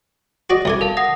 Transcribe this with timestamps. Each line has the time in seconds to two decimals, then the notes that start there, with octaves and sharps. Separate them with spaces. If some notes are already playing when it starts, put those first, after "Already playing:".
0.50 F#4 D5 D#5
0.65 C2 A4 E5 G#5 D6
0.81 A#4 F5 A5
0.97 F#5 D#6 A#6